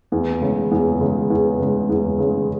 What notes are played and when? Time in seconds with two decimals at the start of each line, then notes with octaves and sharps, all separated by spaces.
0.12 E2
0.41 C#3 G#3
0.71 E2
1.01 C#3 G#3
1.30 E2
1.59 C#3 G#3
1.89 E2
2.19 C#3 G#3